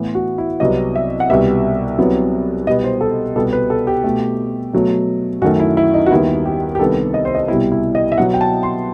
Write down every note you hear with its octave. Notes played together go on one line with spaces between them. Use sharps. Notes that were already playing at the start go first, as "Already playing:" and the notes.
Already playing: A2 E3 B3
F#4
E4
C2 C3 F#3 B3 D#5
E5
F#5
C2 B2 G3 B3 E5
C2 C3 F#3 B3
B2 G3 B3 D#5
C5
A4
C2 B2 G3 B3 A4
B4
A4
G4
B2 A3
B2 F#3 A3
F#2 D#3 A3 F#4
E4
E4
D#4
F#4
D#2 D#3 G3 B3 E4
G4
G4
C2 C3 D#3 G3 B3 A4
D#5
C5
D#5
C2 B2 G3 B3 E4
E4
D#5
E5
B2 F#3 B3 F#5
G5
A5
C6